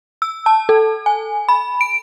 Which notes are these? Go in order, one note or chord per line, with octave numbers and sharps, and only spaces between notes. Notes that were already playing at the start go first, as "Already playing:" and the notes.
E6
A5
A4
G#5
B5
D7